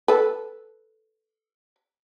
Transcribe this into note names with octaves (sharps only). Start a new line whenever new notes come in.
A4 B4